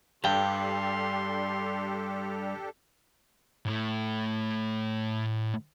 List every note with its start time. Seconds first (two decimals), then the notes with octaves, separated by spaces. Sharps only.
0.24 G2 G3 D4 G4 A4 G5 C6
3.66 A2 A3